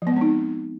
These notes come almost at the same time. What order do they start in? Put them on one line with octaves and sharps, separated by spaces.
F3 B3 G#3 C4 D#4